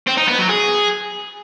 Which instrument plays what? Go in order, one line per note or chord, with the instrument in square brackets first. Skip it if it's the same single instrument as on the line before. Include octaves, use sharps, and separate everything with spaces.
[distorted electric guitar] C4
D#4
B3
F#3
G#4